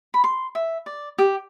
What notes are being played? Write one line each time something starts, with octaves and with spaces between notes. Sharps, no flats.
B5
C6
E5
D5
G4